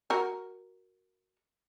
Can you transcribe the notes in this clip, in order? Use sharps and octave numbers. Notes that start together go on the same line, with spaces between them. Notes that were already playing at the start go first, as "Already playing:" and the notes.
F#4 A#4